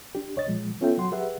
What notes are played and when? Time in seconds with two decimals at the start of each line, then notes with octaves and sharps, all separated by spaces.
0.15 D4 G4
0.36 C2 C#5 D#5 A6
0.48 A#2 F3 G#3
0.81 B3 C#4 F4 A4 E5 G5
0.97 F#3 F#5 C6
1.12 G4 G#4 B4 E5 F#5